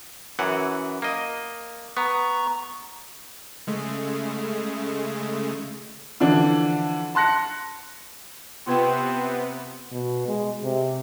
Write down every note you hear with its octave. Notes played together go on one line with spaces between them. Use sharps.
F#2 E3 F#5
A#3 D#5
B3 A#5 C#6
C#3 G#3 A3
D3 E3 F3 D4
A5 C6 F#6 A#6 C#7
C3 B3 C4 F4 B4 G5
B2
G#3
C3